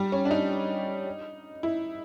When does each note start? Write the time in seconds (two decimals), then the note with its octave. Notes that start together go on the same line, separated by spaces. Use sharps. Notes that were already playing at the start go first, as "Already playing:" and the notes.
Already playing: G3
0.12 C#4
0.25 D4
0.31 D#4
1.63 E4